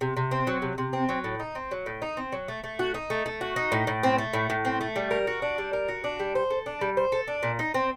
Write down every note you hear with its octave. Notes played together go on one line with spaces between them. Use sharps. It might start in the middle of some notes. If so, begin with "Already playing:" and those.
C3
C3
C4
F#3
C3
C3
C4
F#3
A2
D#4
C4
F#3
A2
D#4
C4
F#3
A3
A3
F#4
D#4
A3
A3
F#4
D#4
A2
A2
C4
A3
A2
A2
C4
A3
G3
A#4
F#4
D4
G3
A#4
F#4
D4
G3
C5
A4
D4
G3
C5
A4
D4
A#2
D#4
C4